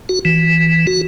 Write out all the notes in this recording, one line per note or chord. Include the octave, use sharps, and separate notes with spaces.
F#4
E3
F#4